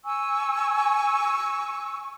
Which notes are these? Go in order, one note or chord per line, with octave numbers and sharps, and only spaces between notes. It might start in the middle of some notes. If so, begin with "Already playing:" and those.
G#5 C#6 E6